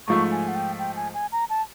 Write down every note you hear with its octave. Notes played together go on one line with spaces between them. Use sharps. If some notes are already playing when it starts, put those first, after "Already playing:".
G#2 F3 A3 C#6
G#5
F#5
G5
G5
G#5
G#5
A#5
A5